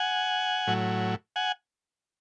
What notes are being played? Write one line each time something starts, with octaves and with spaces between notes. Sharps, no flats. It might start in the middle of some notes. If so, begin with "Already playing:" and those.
Already playing: F#5 G#5
A2 F#3
F#5 G#5